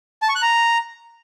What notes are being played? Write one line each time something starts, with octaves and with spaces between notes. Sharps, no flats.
A5
C#6
F#6
A#5